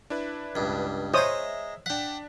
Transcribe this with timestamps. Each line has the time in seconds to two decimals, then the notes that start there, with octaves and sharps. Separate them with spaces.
0.10 D4 E4 B4
0.55 C#2 G2
1.14 G#3 C5 C#5 E5 A#5 D#6
1.86 D4 F#5 G5 B6